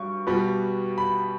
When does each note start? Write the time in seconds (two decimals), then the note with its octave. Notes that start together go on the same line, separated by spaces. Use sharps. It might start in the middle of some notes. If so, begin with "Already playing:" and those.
Already playing: G2 F#3 C#6
0.27 B2 G3 B3
0.98 B5